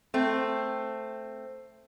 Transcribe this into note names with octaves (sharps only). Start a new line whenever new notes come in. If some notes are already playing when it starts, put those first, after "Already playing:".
A3 C4